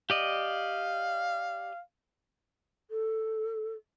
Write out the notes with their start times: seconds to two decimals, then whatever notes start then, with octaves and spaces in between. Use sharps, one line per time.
0.10 G4 D5 D#5 F5
2.90 A4